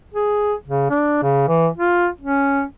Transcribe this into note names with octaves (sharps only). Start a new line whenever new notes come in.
G#4
C#3
D4
C#3
E3
F4
C#4